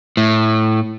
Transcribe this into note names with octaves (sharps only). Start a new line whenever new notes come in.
A2